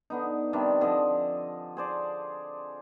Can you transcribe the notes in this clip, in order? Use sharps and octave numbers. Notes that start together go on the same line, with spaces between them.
D3 B3 D#4
C3 D#3 G3 D4
D3 F3 D#5 G#5
G#4 C5 D5